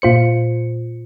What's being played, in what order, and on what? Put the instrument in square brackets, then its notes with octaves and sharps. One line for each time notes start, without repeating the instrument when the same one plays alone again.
[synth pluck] A#2 F4 C5 C#7